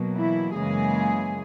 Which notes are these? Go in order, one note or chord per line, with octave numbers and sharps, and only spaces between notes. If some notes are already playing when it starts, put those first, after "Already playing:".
Already playing: B2 F#3 A#3
E3 E4
F#2 C#3 E3 G#3 A#3 G#4